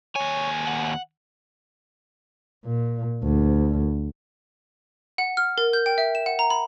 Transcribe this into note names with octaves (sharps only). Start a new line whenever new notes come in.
D#2 C#5 G#5
F#5
A#2
D2
F#5
F6
A#4
G6
G5
E5
E7
F#5
A#5
B5